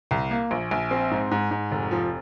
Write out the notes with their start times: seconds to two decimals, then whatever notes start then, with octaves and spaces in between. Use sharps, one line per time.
0.11 C2
0.31 A#3
0.51 A#1
0.71 A#1
0.91 C4
1.11 G#2
1.31 G#2
1.51 G#2
1.71 F1
1.91 F3